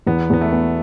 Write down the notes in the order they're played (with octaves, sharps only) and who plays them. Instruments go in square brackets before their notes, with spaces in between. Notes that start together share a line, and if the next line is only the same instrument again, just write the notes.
[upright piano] E2 [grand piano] B3
[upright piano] E2 [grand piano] B3
[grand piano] A3
[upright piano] B3